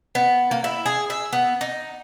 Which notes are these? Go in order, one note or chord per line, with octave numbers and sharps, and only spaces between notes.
B3
A#3
E4
G#4
E5
B3
D#4